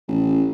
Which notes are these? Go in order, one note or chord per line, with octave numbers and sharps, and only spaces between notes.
A1